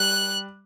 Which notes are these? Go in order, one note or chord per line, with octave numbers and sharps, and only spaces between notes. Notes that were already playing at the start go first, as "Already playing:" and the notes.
Already playing: G3 F#6